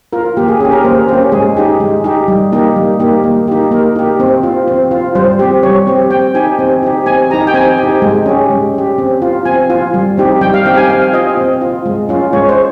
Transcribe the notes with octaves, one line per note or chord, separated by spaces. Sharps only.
F4 A#4
A#3 G4
G#4
C#4 G4 G#4
A#4
A#3 C5
C#4 G4 C5
G#3 G#4
D#4 G4
G#3
D#4 G4
G3
A#3 D#4 G4
G3
A#3 D#4 G4
A#3
D#4 G4
A#3 A#4
D#4 G4
C4
F4
C4
F4
G3 C5
C4 G4
G3 C#5
C4 G4
C4 G5
D#4 G4 G#5
C4
D#4 G4
C4 G#5
D#4 G4 A#5
G5
C4 G#5
D#4 G4
G#3
C#4 G4
G#3
C#4 G4
C4
F4
C4 G#5
F4
G3
C4 D#4 G4
G3 G5
F5
C4 D#4 G4 G5
G#5
C4 F5
F4 D#5
C4
F4
G#3
C#4 F4
G#3 C#5
C5